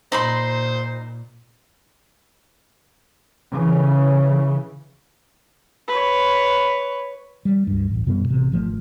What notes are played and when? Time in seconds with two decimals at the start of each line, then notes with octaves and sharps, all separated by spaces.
0.12 A#2 D#4 C5 B5 C6
3.51 C#3 E3 C#4
5.88 B4 C#5
7.45 G3
7.67 C#2 G2
7.90 D1 A1
8.06 F#2 B2 G3 B3
8.29 A1 C3
8.52 G#1 F3 A3